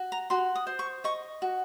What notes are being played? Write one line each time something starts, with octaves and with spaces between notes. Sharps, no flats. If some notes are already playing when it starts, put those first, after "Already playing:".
Already playing: F#4
A#5
F#4 C6
D#6
C5
C#6
D#5 C#6
F#4